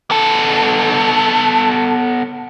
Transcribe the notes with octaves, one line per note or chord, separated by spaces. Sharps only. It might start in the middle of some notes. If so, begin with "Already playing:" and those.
B3 A4